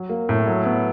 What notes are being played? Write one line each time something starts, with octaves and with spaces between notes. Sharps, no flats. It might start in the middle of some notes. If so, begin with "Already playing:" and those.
Already playing: F#3
A#3
A2
F#3
B3